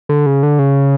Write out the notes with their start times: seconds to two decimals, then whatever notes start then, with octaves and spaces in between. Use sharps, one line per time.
0.09 D3
0.26 C#3
0.43 D3
0.59 C#3